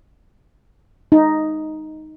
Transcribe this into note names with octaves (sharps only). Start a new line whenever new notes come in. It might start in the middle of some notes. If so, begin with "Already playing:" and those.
D#4